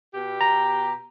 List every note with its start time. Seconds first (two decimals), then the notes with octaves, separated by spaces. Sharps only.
0.14 B2 G4
0.41 A#5